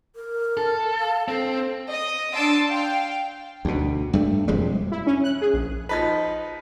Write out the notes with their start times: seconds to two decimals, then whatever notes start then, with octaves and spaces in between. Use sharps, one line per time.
0.16 A#4
0.57 A4
0.99 F5
1.28 C4 A4
1.90 D#5
2.33 D4 A5 C6 E6 D7
2.68 F5 G5
3.65 D2 B2
4.13 G2 A3
4.48 E1 F2 G3 G#3
4.92 E4
5.07 C#4
5.24 F#6
5.41 G#4
5.54 A#1
5.89 F3 D#4 B4